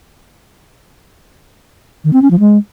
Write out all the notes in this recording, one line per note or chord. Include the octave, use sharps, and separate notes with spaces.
D#3
C4
C#4
F3
G#3